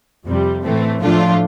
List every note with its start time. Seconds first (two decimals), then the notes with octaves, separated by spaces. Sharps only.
0.25 F2 C3 G3
0.63 A2 E3 A3 C4
1.01 A2 F3 A3 D4 F4